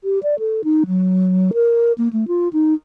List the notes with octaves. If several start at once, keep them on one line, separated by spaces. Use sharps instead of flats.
G4
D5
A4
D#4
F#3
A#4
A#3
A3
F4
D#4